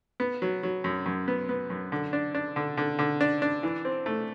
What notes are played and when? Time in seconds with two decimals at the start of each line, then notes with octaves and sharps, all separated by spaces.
0.20 B3
0.42 F#3
0.63 F#3
0.84 F#2
1.06 F#2
1.28 B3
1.49 B3
1.70 F#2
1.92 D3
2.13 D4
2.35 D4
2.56 D3
2.77 D3
2.99 D3
3.21 D4
3.42 D4
3.63 E3
3.85 C4
4.06 A3